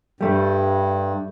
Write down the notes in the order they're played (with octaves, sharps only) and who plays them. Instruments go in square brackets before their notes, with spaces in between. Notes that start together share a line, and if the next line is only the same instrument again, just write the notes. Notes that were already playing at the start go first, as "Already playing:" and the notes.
[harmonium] G2 [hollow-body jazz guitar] G3 A3